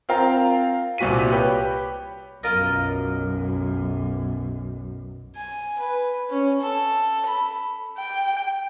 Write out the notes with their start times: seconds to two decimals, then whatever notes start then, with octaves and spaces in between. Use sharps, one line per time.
0.09 C4 F4 A#4 F5 G5 A#5
0.98 C2 A#2 F#4 B6 D#7
1.32 G4 B4 C#5 G5
2.43 B1 F#2 F4 A#4 D#5
5.36 G#5
5.79 B4
6.30 C#4
6.62 A4
7.26 B5
7.98 G5